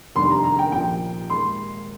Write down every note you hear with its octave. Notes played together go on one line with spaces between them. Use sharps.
F1 D#2 D3 G3 C6
A#5
A#5
G5
A#1 A#2 F3 G5
D#2 D#3 G#3 C6